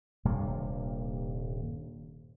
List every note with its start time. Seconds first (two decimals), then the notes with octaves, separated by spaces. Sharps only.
0.25 D#1 G2 C3 A#3